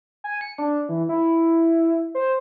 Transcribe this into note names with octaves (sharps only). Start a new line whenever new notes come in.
G#5
C#7
D4
E3
E4
C5